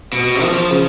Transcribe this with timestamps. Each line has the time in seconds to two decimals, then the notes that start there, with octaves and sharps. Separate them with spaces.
0.13 B2
0.42 F3
0.71 C#3